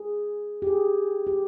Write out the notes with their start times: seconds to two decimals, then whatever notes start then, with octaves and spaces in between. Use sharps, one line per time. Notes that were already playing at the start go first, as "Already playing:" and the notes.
Already playing: G#4
0.62 G4
0.67 G#4
1.27 G4